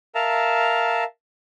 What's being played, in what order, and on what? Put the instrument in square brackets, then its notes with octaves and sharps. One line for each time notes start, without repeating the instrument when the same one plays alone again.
[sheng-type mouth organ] A#4 E5 F5 A5 A#5